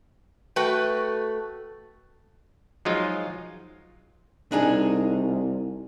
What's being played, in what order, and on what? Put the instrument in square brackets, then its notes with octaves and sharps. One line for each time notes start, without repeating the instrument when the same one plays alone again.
[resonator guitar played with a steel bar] A3 F#4 B4 G5
[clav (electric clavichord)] F3 F#3 G#3 D#4 F4
[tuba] C2 [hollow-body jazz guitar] D4 D#4 G#4